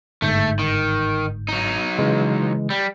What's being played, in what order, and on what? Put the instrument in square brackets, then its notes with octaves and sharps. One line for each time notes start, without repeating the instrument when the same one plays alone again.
[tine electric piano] G1 G#2 G6 [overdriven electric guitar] A3
[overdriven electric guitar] D#3
F#3 D#4
[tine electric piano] C#3 E3 G#3
[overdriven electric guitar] G3